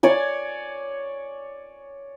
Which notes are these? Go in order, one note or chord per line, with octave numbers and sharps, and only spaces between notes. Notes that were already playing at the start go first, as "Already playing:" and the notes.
C#5 D5 G#5